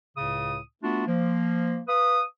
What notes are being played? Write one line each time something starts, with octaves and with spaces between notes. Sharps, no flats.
C#2 A2 C#3 D#6
A3 B3 D4 F4 F#4
F3 A#3
B4 F5 D#6